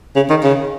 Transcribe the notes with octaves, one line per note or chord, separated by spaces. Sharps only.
C#3
D#3
C#3